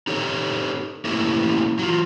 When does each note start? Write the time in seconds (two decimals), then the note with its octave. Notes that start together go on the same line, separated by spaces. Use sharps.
0.07 D#4 G4 A4 C#5
1.05 A3 A#3 C#4 E4 G4
1.79 F#3 F4